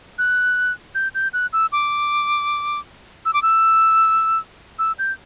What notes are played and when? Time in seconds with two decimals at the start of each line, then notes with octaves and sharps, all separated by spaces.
0.18 F#6
0.95 G6
1.15 G6
1.33 F#6
1.53 E6
1.72 D6
3.25 E6
3.33 D6
3.42 E6
4.79 E6
4.99 G6